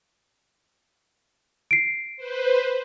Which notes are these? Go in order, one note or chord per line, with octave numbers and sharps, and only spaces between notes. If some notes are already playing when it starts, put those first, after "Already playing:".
C7 D7
B4 C5